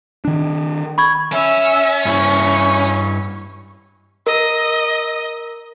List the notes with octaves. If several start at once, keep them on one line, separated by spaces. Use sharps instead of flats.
D#3 D4
B5 C#6 G#6
C#4 E5
G2 E4 C#6
A#4 D#5